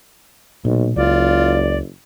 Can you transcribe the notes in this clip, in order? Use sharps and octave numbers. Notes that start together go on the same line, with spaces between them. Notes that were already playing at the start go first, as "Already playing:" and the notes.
B1 A#2
F#1 C#2 F4 D5